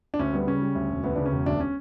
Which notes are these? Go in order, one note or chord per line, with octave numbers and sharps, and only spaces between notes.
D4
D2 C#4
G3 B3
C#3 C#4
G3
D2
E1
D2 B3
C#3 D4
C#4
E1
D2 D4
C#4